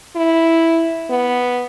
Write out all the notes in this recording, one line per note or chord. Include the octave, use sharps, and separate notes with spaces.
E4
B3